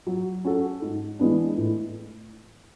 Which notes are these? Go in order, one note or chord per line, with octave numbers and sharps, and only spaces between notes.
F#3
C#4 F#4 A4
G#2
E3 G#3 B3 D4
A2